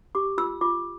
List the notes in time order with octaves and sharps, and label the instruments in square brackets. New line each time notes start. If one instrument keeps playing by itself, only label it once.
[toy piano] G4 D6
F4 E6
F4 D6